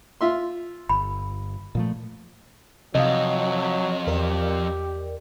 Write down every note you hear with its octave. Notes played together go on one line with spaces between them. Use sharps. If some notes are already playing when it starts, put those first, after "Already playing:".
F4 E5 C6
G1 B5
A#2 F3 A3
F2 C3 F#3 D#5 F5
E2 G4 A#4 D5